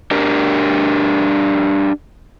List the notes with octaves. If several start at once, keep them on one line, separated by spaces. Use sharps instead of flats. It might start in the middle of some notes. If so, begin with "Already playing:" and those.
D4 G4 A#4